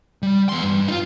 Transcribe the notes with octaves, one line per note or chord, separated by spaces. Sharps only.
G3
E2 C6
G2
D#4 F4